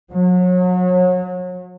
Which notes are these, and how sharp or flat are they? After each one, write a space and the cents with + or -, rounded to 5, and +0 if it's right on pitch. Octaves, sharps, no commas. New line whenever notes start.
F#3 -30